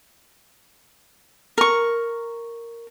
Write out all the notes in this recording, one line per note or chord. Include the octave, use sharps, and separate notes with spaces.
A#4 C#6